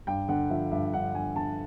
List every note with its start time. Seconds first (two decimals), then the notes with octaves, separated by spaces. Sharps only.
0.07 G2 G5
0.29 D3 F#5
0.50 F3 E5
0.71 G2 E5
0.93 G2 F#5
1.14 G2 G#5
1.36 D3 A5